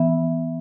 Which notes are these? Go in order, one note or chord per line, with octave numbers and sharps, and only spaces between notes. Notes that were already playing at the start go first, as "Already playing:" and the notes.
Already playing: E3 B3 E5